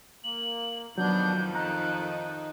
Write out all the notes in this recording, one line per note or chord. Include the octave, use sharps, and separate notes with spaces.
A#3 F#7
F2 B2 D#3 F#3 B3 D4 A4 G6
D#4 A#5 F#6